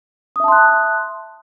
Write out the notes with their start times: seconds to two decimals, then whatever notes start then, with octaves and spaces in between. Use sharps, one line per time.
0.36 D#6
0.40 E5
0.44 A5
0.48 C6
0.52 F#6